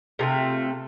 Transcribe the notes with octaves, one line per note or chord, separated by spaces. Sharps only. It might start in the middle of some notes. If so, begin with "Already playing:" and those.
C3 A3 F4